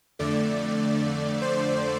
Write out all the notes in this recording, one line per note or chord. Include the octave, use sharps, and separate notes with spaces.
F2 D3 A3 D5
C5